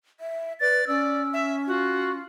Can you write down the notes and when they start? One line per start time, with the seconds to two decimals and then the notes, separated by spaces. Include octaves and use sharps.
0.20 E5
0.61 B4 D5 A6
0.88 C#4 D5 E6
1.33 E5
1.67 F4 F#4